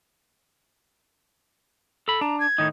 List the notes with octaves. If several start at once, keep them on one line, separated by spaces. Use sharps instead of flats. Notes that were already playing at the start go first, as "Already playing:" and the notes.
A4 B5
D4 A#5
G#6
A2 D#3 D#4